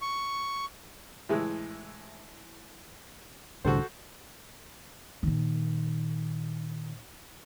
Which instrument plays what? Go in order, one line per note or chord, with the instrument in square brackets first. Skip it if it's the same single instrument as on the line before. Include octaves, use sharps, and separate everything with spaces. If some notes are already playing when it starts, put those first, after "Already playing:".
[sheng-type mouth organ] C#6
[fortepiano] A2 E3 G#3
[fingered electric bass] C2 A2 D3 [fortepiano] F#4 A4 C5
[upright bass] A#2 D#3